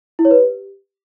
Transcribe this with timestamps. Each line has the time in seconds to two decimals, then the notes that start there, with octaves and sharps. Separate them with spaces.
0.19 E4
0.25 C#5
0.31 B4
0.37 G4